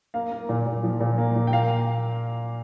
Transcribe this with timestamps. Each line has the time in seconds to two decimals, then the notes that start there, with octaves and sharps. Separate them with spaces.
0.14 A#3 F5
0.32 A#3
0.49 A#2
0.67 A#2
0.83 F3
1.01 A#2
1.18 A#3
1.36 A#2
1.47 G5
1.53 A#3 F5